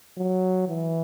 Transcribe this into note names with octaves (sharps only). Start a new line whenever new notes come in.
F#3
E3